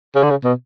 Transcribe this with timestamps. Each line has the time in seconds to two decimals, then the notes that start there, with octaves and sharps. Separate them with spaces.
0.15 C#3
0.23 D3
0.30 C#3
0.44 B2